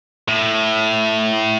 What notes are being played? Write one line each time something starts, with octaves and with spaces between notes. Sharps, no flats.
A2